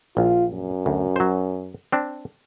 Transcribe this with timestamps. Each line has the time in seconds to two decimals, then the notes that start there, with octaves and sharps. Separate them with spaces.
0.17 A#1 F4
0.50 F#2
0.86 D2
1.16 F#3 C5
1.92 C4 D4